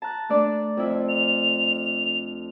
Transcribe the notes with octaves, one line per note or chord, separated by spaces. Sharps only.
A5 A#5 F#6
A3 D4 D5
F2 E4
F7